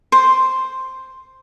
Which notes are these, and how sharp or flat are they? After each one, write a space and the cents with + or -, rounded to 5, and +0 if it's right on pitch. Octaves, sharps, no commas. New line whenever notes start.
C5 +0 C6 +10